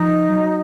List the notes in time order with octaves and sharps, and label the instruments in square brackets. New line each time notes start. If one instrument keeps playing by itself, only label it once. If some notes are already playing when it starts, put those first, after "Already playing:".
Already playing: [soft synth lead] F3 [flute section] D#4 D#5
[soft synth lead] F#3